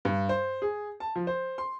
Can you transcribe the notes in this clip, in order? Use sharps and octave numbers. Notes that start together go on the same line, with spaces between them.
G2
C5
G#4
A5
F3
C5
C6